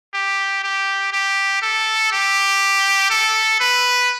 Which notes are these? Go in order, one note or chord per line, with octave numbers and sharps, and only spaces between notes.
G4
G4
G4
A4
G4
A4
B4